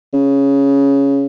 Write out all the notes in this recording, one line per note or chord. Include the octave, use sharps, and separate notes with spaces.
C#3